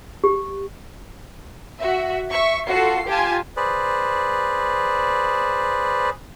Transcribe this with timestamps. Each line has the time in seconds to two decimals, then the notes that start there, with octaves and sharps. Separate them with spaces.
0.24 G4
1.79 F#4 E5
2.31 E5 C#6
2.69 F4 F#4 A4 C7
3.08 F4 G4 G#5 A5
3.57 G#4 B4 C5 D5